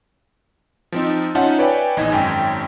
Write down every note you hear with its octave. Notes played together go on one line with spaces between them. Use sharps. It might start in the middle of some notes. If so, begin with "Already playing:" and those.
F3 C4 D#4
C#4 D#4 F4 E5 F#5 A5
B4 C#5 D5 E5 G5 G#5
A#1 E2 D#4 D#5 G#5 G#6
G#1 F#2 G5